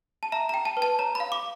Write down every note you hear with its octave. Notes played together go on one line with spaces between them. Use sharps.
A5
E5 A#5
A#5
G5
A5
B4
A5
C#5 A#5
B5
F5
D6